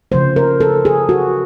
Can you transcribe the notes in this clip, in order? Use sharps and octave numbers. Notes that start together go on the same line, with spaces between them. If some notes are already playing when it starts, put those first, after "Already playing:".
C#3 F3 A3 C5
A#4
A4
G#4
F#4